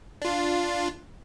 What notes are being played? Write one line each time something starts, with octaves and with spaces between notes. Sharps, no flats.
D4 F4